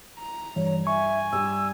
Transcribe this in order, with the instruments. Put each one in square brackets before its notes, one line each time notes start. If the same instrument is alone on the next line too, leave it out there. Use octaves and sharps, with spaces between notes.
[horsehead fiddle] A#5
[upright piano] G2 [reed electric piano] E3 [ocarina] C#5
[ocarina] E5 [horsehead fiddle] G#5 [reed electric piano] C#6
[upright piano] G2 G3 [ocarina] E6